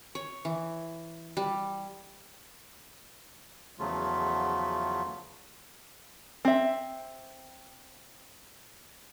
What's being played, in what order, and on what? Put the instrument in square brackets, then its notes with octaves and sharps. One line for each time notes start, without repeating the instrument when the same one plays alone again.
[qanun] C#5
E3
G3
[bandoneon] E2 C#3 F3 F#3 A3 F4
[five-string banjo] C4 E5